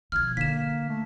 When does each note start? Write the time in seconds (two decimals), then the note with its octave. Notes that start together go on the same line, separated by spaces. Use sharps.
0.12 B2 F3 F6 G#6
0.37 D3 A#3 B6 E7
0.89 A3